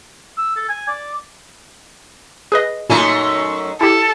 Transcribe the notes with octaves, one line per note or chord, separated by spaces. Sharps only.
E6
A4
G#5
D5
G#4 B4 D#5
F#2 A#2 A3 D#4 G#5
E4 G4 A4